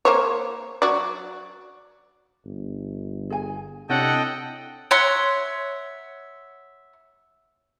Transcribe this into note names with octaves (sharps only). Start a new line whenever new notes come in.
A#3 C5 C#5
F#3 F#4 D5
G1
G#4 G#5
C3 D4 E4 A4 C#5 D#5 F#5 G5
C#5 E5 F#5 C6